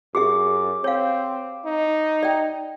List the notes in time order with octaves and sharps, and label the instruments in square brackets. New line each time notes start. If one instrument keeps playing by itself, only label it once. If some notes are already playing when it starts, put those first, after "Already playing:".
[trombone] F#2 [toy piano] G4 G#4 E5 [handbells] D6
[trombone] C4 [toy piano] C#5 F5
[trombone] D#4
[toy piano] D5 E5 G5